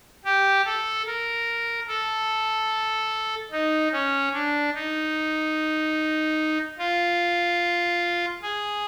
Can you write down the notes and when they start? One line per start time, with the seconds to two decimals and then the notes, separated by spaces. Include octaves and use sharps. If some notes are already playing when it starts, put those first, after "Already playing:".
0.25 G4
0.66 A4
1.06 A#4
1.88 A4
3.51 D#4
3.92 C#4
4.33 D4
4.74 D#4
6.78 F4
8.42 G#4